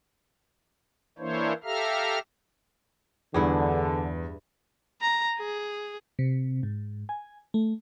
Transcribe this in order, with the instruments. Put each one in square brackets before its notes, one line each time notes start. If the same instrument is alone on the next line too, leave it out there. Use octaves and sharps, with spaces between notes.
[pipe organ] E3 A#3 D4 E4 C5 C#5
G4 A4 E5 F5 A#5 F6
[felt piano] E2 [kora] G2 E4 G#4 [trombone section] D3
[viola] A#5
G#4
[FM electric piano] C3
G#2
G#5
A3